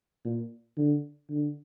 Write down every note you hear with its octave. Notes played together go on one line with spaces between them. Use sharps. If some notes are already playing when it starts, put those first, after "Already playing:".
A#2
D3
D3